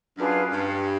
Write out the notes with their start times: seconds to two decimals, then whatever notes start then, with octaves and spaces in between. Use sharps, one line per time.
0.17 F#2 D4 F4 G#4 B4
0.51 G2